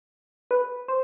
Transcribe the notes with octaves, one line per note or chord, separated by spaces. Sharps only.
B4
C5